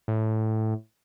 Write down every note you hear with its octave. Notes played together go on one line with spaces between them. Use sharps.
A2